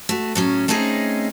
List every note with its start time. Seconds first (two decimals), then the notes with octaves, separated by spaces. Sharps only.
0.09 A3 F#4
0.35 A2 F#3 C#4
0.68 A3 C4 C#4 D#4 G#4 D#5